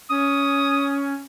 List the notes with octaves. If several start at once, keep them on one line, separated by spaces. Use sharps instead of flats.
C#4 D#6